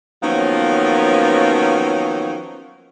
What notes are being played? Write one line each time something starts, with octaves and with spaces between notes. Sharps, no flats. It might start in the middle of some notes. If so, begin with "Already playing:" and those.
D#3 F3 F#3 A#3 B3 C#4